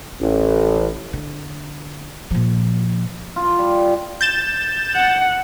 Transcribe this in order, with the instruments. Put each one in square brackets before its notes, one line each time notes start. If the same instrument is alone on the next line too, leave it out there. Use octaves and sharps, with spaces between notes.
[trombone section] A1
[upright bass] D3
A#2 F3
[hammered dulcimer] F4
G3
[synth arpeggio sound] G6 A6 E7
[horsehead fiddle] F#5